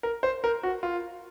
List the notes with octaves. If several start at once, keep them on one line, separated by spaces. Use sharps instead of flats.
A#4
C5
A#4
F#4
F4